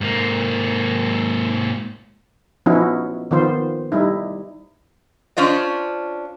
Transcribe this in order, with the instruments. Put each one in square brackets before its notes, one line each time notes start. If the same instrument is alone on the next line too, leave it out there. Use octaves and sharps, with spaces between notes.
[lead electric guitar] G#2 A#3
[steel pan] F3 B3 C#4 D#4 E4 F#4
D#3 F3 B3 F4 C5
G3 D#4 E4
[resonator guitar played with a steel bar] C#4 D4 F4 C5 D#5